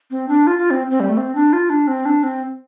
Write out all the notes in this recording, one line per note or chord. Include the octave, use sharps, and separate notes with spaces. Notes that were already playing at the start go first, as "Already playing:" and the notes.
C4
D4
F4
F4
C4
C4
G3
A3
C4
D4
F4
D4
C4
D4
C4